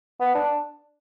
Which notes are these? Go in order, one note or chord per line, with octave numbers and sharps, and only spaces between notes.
B3
D4